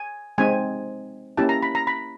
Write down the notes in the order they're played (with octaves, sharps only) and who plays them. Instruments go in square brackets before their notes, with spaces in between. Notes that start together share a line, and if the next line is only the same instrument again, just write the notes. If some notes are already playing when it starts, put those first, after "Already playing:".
Already playing: [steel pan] G#5
G#3 C4 D#4 G#5
A#3 C#4 E4 G4 A5
A#5
B5
A#5
B5